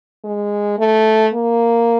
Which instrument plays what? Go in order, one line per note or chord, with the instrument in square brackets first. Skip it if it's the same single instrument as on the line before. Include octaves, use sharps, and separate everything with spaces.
[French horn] G#3
A3
A#3